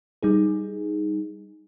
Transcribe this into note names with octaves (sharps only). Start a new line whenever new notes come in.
G3 D#4 G#4